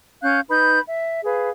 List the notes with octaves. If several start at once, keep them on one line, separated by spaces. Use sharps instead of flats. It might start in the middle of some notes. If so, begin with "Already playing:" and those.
C#4 F5 F#6 G6
D#4 B4 B5 G6
E5
G#4 B4 F5